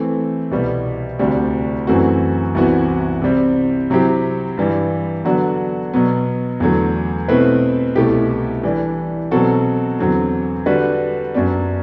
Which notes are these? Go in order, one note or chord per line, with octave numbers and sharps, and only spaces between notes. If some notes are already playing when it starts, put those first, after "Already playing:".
Already playing: E3 A3 C4
C2 B2 G3 B3
D2 C3 G3 D4 F#4
F#2 E3 A3 C4 F#4
C2 C3 E3 B3 F#4
C3 G3 C4
C3 F#3 C4 E4 G4
G2 E3 G3
D3 F#3 B3 D4 F#4
B2 F#3 B3
E2 D3 F#3 A3
B2 A3 C4 E4 B4
C2 B2 A3 E4 G4
E3 G3 D4
B2 F#3 C4 F#4 A4
E2 D3 F#3 C4
D3 G3 D4 F#4 B4
F#2 F#3 B3 D4